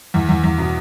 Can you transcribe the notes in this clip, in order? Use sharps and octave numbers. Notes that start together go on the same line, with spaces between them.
E2
E2
E2
B2